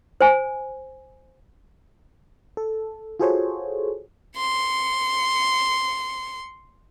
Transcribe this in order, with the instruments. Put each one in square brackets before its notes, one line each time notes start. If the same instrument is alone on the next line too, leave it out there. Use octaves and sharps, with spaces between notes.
[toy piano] C5 G#5
[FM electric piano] A4
F4 F#4 G#4 A4 C5 C#5
[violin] C6 C#7